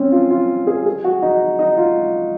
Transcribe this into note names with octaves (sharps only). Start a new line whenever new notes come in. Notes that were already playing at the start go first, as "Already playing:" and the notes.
Already playing: C4 C#4
F4
F4
G#4
G#4
F#4
D#4
D#4
F4